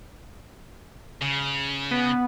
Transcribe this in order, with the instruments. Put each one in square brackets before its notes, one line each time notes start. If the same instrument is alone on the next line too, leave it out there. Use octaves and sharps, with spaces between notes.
[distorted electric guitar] C#3
[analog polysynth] B3